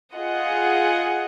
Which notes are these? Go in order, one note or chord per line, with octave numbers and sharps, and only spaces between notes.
F4 G#4 D#5 F#5